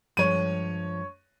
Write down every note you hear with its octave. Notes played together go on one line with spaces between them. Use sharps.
G2 F3 G#3 C#5 D#7